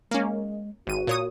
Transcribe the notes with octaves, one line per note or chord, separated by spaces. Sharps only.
G#3 A#3 C#4
G#1 F#4 D#7
A#2 C#5 D#6